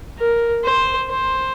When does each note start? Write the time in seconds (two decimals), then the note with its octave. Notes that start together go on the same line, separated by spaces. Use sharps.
0.19 A#4
0.64 C5
1.10 C5